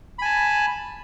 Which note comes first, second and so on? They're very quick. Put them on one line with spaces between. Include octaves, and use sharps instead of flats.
B5 G#5 A5